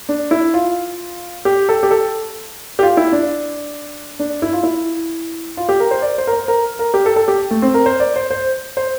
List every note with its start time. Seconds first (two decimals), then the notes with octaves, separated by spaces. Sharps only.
0.09 D4
0.31 E4
0.54 F4
1.45 G4
1.69 A4
1.83 G4
1.91 A4
2.79 G4
2.83 F4
2.97 E4
3.12 D4
4.19 D4
4.42 E4
4.53 F4
4.63 E4
5.57 F4
5.69 G4
5.80 A#4
5.91 C5
6.02 D5
6.18 C5
6.27 A#4
6.33 C5
6.48 A#4
6.79 A#4
6.94 G4
7.06 A4
7.16 A4
7.28 G4
7.51 A3
7.62 C4
7.74 A#4
7.86 C5
8.00 D5
8.16 C5
8.31 C5
8.77 C5